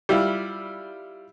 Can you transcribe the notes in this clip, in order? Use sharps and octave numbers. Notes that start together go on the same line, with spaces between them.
G3 E4 F4